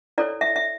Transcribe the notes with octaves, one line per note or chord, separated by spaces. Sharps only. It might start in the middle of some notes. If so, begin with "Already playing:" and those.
E4 A4 C#5 D5
E5
E5